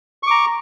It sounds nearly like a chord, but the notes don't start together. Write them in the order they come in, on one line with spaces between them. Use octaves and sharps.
C#6 D6 A#5